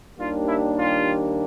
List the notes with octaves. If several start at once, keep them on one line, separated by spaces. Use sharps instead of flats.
D#2 D#3 G3 A#3 D4 F4
E4
F4